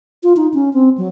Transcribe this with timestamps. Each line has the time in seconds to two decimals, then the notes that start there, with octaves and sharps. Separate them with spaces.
0.23 F4
0.37 D#4
0.54 C#4
0.74 C4
0.98 F#3